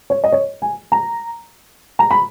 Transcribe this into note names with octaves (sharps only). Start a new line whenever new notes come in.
C#5
D#5
C#5
G#5
A#5
A#5
B5